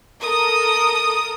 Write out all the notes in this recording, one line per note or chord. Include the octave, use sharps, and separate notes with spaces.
A4 A#4 D#6